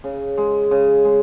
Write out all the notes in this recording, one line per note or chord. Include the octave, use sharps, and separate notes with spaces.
C#3
G#3
C#3
G#3